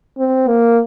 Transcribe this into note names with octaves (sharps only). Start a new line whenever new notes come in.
C4
A#3